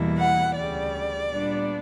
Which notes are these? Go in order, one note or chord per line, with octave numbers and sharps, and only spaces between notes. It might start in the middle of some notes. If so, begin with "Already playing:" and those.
Already playing: E2 B2 G3 A#3 E4
F#5
D2 C#3 G3 D5
A#2 G3 B3 D4